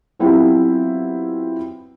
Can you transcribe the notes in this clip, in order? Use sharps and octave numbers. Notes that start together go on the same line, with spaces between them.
F#3 B3 C4 E4 F4 G4